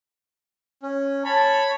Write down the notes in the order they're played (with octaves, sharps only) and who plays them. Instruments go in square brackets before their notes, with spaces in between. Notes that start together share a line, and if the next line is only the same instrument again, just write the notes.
[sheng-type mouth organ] C#4
[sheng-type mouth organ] C#5 B5 [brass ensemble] A5